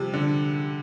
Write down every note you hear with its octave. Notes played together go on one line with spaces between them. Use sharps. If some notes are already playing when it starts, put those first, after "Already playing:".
Already playing: C3 F3 G3
D3